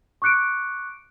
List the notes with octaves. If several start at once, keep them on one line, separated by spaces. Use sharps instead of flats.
C#6 D6 F#6 C#7 D7